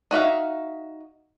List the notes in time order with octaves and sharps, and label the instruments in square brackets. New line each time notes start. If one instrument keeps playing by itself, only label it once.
[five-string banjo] D#4 F#4 E5 F5